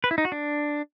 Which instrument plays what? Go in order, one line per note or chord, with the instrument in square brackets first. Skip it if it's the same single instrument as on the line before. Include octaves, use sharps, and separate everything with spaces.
[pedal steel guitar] B4
E4
D#4
F#4
D4